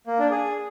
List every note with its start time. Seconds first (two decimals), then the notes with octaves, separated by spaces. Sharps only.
0.07 A#3
0.19 D4
0.31 G#4